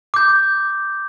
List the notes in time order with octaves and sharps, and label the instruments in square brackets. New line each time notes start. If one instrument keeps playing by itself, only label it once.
[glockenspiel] D6 G6